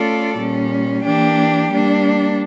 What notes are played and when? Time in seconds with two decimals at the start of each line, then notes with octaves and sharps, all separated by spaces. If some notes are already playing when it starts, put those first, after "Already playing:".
Already playing: A3 C#4 F4 A4 D5
0.38 A#2 G3 C#4
1.03 E3 A#3 D4 G4
1.70 G3 A#3 D4